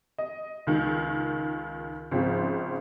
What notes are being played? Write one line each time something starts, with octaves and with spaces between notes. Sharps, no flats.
D#5
C#2 D#3
G#1 C#3 F3 C4